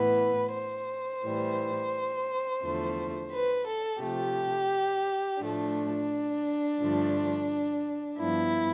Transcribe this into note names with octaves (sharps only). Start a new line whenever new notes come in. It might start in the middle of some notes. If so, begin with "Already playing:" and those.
Already playing: A2 E3 B3 B4
C5
A2 E3 G3
E2 D3 F3 A3
B4
A4
C3 F3 A3 G4
A2 F3 A3 D4
G2 D3 F3 A3
G2 F3 B3 E4